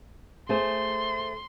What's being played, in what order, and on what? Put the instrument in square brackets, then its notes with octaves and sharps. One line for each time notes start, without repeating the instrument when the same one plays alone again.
[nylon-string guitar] A3 G#4 C5 [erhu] C6